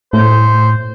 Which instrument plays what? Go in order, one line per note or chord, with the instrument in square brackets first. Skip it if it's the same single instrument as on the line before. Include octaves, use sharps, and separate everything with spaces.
[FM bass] A2 [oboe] C5